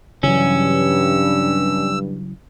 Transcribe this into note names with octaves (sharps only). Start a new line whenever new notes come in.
G2 C#3 E3 F#3 C#4 E6